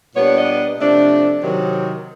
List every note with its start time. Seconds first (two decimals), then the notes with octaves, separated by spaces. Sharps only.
0.15 A#2 G3 B3 D4 C#5
0.36 D#5
0.78 C3 F3 A3 D4
1.42 C3 D#3 F#3